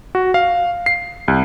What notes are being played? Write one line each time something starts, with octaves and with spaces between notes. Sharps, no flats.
F#4
F5
C7
C2